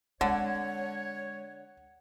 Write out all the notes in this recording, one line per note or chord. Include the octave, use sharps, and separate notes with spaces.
D3 G#3 C4 C#5 F#5